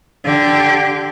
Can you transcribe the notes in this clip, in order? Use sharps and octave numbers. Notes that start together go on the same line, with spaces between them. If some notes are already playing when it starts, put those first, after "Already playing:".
D3 G4